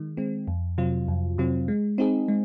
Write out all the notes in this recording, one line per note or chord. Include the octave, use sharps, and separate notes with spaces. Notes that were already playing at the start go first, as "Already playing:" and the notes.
Already playing: D#3 G#3
G#3 C4
F2
C3 F#3 C4 F4
F2
C3 F#3 C4 F4
G#3
C4 D#4 G#4
G#3